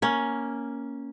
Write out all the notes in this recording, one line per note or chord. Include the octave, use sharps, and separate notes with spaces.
A#3 C#4